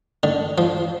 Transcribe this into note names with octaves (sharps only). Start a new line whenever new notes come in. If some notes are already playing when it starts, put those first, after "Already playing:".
D3
F3